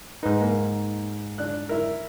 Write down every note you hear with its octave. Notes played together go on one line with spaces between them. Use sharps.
G#2 D#4 B4
A#3
D4 F#6
E4 A#4